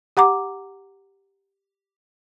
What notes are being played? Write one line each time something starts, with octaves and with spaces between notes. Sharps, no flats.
G4 F#5 A#5 D6